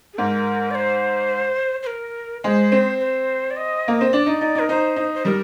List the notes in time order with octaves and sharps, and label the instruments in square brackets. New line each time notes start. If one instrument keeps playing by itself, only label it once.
[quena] G#4
[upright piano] G#2 [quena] A#4
[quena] D5
C5
C5
A#4
[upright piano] G#3 [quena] C5
[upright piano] C4
[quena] C5
D5
D#5
[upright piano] A#3
C4
[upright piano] D4 [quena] D5
[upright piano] D#4
D#4
[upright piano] D#4 [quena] A#4
[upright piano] D#4 [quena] C5
[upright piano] D#4
[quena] C5
[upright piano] G3 [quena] A#4